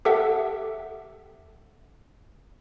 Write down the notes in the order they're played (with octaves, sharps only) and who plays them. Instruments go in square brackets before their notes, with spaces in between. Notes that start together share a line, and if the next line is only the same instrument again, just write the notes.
[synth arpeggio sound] G4 A4 E5 F#5